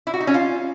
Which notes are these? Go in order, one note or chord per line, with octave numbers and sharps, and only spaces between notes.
E4
F#4
D#4
C#4
F4